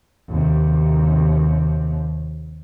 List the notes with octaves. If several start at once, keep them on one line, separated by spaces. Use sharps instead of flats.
D#2 C3